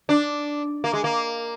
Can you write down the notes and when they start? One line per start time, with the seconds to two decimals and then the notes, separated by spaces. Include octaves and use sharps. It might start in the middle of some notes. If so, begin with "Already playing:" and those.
0.09 D4
0.84 A#3
0.93 G#3
1.04 A#3